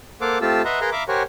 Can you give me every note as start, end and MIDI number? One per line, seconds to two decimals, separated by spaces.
0.21 0.38 58
0.21 0.38 69
0.21 0.38 72
0.21 0.38 77
0.21 0.38 78
0.21 0.38 86
0.41 0.62 57
0.41 0.62 60
0.41 0.62 65
0.41 0.62 67
0.41 0.62 81
0.41 0.62 88
0.65 0.80 71
0.65 0.80 75
0.65 0.80 76
0.65 0.80 78
0.65 0.80 82
0.65 0.80 84
0.81 0.90 68
0.81 0.90 70
0.81 0.90 71
0.81 0.90 77
0.81 0.90 82
0.81 0.90 84
0.92 1.03 76
0.92 1.03 77
0.92 1.03 82
0.92 1.03 83
0.92 1.03 86
1.08 1.23 67
1.08 1.23 70
1.08 1.23 72
1.08 1.23 73
1.08 1.23 78
1.08 1.23 80